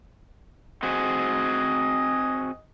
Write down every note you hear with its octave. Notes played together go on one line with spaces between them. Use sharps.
C4 F#4 G#4 D#5